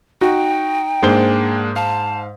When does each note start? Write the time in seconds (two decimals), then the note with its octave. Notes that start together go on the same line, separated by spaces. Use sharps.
0.21 D#4 F#4 G5
1.03 G#2 G#3 A#3 D4 C5 G7
1.76 F5 A5